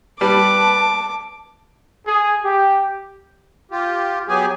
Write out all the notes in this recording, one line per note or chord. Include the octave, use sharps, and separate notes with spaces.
G3 B4 A5 D6
G#4
G4
F4 G4
F#3 B3 G4 G#4 G#5